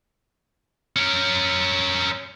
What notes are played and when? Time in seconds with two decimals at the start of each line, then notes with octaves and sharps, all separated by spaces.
0.96 C#4 A#4